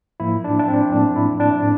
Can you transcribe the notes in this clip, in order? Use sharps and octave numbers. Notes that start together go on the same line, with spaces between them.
A2 F3 A#3 E4
D4
D4
C4
A2 F3 A#3 D4
E4
D4
A2